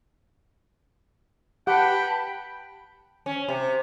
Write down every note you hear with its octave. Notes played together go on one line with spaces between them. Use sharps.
G4 B4 F#5 G5 A5 B5
C#4
C3